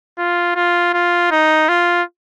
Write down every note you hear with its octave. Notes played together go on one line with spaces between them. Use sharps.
F4
F4
F4
D#4
F4